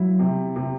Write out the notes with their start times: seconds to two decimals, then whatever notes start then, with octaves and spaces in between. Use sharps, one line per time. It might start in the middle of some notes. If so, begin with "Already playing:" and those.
Already playing: F#3 E4
0.19 C3
0.56 C3